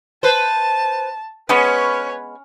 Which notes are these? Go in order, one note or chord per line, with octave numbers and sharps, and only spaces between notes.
B4 C5 A5
G#3 B3 C#4 B4 C#5 C#6